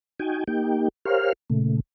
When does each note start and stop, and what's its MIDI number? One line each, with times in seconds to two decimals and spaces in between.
0.19 0.44 63
0.19 0.44 66
0.19 0.44 79
0.19 0.44 80
0.48 0.88 58
0.48 0.88 63
0.48 0.88 67
0.48 0.88 79
1.05 1.33 67
1.05 1.33 70
1.05 1.33 72
1.05 1.33 73
1.05 1.33 77
1.05 1.33 89
1.50 1.80 46
1.50 1.80 49
1.50 1.80 57